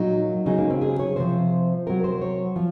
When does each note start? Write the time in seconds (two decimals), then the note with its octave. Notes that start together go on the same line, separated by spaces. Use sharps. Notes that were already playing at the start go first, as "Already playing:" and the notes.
Already playing: A#2 F#3 D#4
0.46 C#3 F#3 D#4
0.58 A#3
0.70 C4
0.81 G#4
1.00 C#5
1.16 C3 F3 C5
1.86 C3 F#3 A#4
2.04 C5
2.22 C#5
2.56 F3